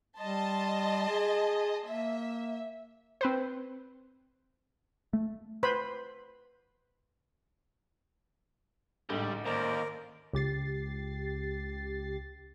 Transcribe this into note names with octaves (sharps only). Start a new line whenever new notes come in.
G3 D#5 A5 C6
G#4
A#3 E5
C4 B4 C5
A3
B4 C5 B5
A1 D2 G#2 G3
D#2 A#4 C5 D5
C#2 G4 A6 C7